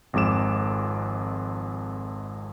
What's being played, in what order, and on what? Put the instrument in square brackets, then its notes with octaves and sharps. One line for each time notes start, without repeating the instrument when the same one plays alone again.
[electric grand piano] G#1 F2 G#3 D6 E7